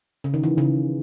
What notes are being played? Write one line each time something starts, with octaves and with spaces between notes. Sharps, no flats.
C#3
D#3
E3
C#3